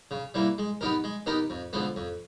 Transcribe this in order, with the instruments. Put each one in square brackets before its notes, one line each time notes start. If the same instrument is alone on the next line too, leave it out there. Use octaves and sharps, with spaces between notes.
[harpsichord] C#3
E3 G3 A#3
G#3
B3 D#4 G4 A#4
G#3
B3 D#4 G4 A#4
F2
D3 F3 G#3 B3
F2